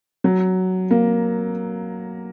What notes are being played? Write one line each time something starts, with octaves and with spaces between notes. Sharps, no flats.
F#3
A#3